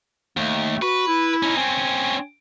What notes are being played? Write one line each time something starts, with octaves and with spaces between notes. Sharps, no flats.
D#2 A3
F#4 B4
E4
C#4 D#4
C4 C#4 G#5